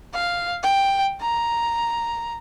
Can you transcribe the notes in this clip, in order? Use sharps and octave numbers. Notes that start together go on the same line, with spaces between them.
F5
G5
A#5